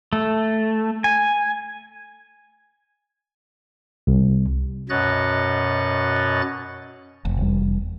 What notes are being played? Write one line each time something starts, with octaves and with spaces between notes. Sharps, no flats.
A3
G#5
C2
F#2 B2 C#5 D#5 F#6 A6
F1
E2 G3